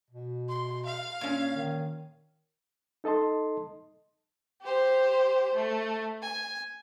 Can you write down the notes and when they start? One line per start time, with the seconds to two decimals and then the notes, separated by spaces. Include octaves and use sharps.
0.10 B2
0.49 C6
0.86 F5
1.21 A#2 C#4
1.55 D#3
3.04 D#4 A4 D#5 A5 C6
4.62 G4 C5
5.55 A3
6.22 G#5